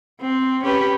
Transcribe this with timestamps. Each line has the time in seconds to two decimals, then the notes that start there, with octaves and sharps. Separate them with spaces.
0.21 C4
0.63 C#4 G4 B4